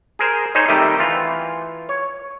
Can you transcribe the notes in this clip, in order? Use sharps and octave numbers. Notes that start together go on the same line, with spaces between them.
G#4 A#4 C5
D#4 G#4 C5 C#5 D#5
C3 D#3 G3 A3 D#4 G4
E3 F4
C#5